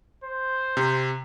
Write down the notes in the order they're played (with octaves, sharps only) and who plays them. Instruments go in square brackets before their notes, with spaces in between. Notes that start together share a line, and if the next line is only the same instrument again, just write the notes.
[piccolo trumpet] C5
[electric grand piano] C3